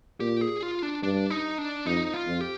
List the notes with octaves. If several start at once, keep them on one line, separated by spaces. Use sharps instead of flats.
A#2 G4
G#4
F4
D4
G2 D4
D#4
D4
F2 D#4
F4
F2
G4